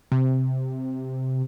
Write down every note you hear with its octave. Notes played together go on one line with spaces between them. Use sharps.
C3